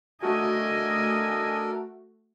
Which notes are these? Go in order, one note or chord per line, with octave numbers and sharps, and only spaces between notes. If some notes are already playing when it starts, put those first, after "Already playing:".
A3 D4 F#4 A4 A#4 D#5 G#5